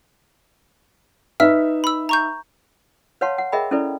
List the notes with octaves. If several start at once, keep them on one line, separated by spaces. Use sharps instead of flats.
D#4 B4 E5 E6 F6 B6
B5 E6
A#5 C#6 G6
B4 C#5 F5 F#5 A5 C6
F#5
G#4 A#4 D#5 E5 G5 B5
C#4 E4 A4 B4 D5